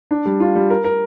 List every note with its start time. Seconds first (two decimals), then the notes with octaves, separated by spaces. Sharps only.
0.11 D4
0.25 G3
0.40 F4
0.55 G3
0.70 A#4
0.84 A#4